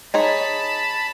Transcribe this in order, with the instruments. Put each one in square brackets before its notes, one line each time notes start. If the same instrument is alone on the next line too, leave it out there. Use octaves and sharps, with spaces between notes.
[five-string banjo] D#4 G#4 C#5 [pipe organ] A5 B5